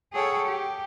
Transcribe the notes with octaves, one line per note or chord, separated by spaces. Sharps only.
G#4 A4 C#5 F#5 G5
G4